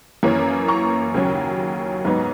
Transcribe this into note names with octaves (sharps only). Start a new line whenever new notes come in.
F#2 E3 A#3 C#4
A#5 C#6
D#2 C#3 F#3 C#4
G#2 F#3 B3 D#4